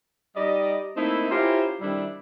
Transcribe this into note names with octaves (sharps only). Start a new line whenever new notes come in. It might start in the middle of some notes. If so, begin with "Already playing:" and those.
G3 D#4 G4 D5 D#5
A3 A#3 C4 D#4 E4
C#4 E4 F4 G4 A#4 C5
C3 D#3 G3 D4 E4 A4